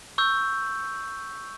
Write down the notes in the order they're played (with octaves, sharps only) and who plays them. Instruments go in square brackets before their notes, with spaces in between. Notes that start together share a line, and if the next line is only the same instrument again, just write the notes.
[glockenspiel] C#6 E6 G6